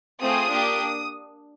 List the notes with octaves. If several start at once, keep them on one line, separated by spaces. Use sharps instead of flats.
A3 C4 F4 G#4 D#6
A#3 D4 G4